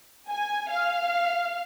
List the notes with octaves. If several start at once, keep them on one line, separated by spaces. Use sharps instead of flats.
G#5
F5